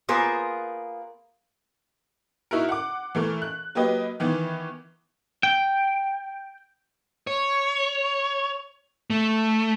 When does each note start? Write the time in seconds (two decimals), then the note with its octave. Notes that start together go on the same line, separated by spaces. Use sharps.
0.09 A#3 B3 F4 G#4 A#4 C5
2.51 D#4 E4 F#4 A#4
2.69 F#5 D6
3.15 E3 A3 A#4
3.42 F#6
3.75 F#3 A#3 G4 B4 D#5
4.20 D#3 E3 B3
5.43 G5
7.27 C#5
9.10 A3